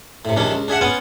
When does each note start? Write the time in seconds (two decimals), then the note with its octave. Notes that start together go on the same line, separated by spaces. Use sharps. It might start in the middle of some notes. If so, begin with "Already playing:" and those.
0.25 A2 C3
0.36 A#1 C3 D#3 C#4 D4
0.52 C#2
0.68 D4 G#4 E5 F#5
0.81 B3 C#4 F4 F#5 G#5